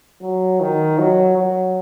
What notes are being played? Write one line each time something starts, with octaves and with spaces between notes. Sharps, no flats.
F#3
D#3
F#3
F#3